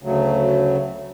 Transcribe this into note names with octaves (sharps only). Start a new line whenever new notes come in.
D2 C#3 F#3 A3